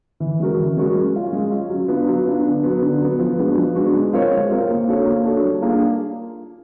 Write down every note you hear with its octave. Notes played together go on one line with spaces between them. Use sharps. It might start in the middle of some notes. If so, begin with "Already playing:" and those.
E3
G#3 C#4 F#4 A#4
E3
G#3 C#4 F#4 A#4
G#3
C#4 F4
G#3
C#4 F4
F#3
B3 D4 F4
F#3
B3 D4 F4
D3
F#3 B3
D3
F#3 B3
F3
G#3 B3 D4 F#4
F3
G#3 B3 D4 F#4
G#3
C4 F4 A#4 C#5
G#3
C4 F4 A#4 C#5
A#3
D4 F#4 A4 C#5
A#3
D4 F#4 A4 C#5
G3
A#3 D4 F4 G#4